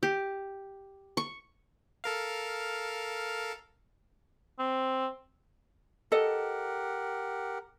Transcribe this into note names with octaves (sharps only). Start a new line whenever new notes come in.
G4
C#6
A4 A#4 F5
C4
G4 A4 A#4 D#5 F#5